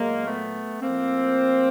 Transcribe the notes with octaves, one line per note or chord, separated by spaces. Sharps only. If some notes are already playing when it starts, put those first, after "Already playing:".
Already playing: A#2 F#3 G#3 A#3
A3 B3
A2 F3 A#3 C4